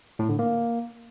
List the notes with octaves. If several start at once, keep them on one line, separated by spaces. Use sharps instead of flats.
A2
D3
A#3